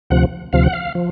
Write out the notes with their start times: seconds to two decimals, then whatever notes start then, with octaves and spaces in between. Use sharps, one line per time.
0.10 D2 C3 F3 F#5
0.53 D2 C3 F3 F5
0.63 F#5
0.73 F5
0.95 F3